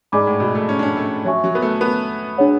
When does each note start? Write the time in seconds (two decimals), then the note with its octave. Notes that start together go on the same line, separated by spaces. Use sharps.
0.12 G#2 G#4 D5 G#5 B5 D6
0.27 A2
0.40 B2
0.55 A3
0.69 C#4
0.79 D4
0.83 C#4
0.97 A3
1.25 F#3 C#5 E5 G#5 C#6
1.44 F#3
1.55 B3
1.62 A3
1.81 B3
2.38 D4 G#4 C#5 F#5